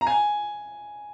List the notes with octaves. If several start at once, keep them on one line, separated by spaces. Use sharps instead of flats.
A#5
G#5